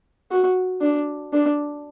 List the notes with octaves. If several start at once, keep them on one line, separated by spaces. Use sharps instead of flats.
F#4
D4
D4